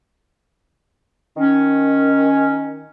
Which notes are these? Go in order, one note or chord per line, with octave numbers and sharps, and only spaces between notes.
D#3 C#4